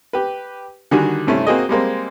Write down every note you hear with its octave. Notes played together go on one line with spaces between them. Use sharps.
G4 B4
D3 D#3 G3 F#4 G#5
G2 C3 A3 C#4 E4
A#3 C4 F#4 G#4 D#5
G3 G#3 A#3 C4